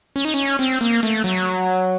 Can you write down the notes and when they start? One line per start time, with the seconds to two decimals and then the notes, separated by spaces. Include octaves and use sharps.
0.16 C#4
0.25 D#4
0.34 C#4
0.59 C4
0.81 A#3
1.03 A3
1.24 F#3